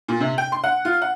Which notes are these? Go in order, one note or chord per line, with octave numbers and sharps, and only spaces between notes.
A#2
C3
G5
C6
F#5
F4
F#5